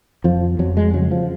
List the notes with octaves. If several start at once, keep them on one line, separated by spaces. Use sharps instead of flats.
F2 F3
F2 F#3
G#3
C#3 F#3
F3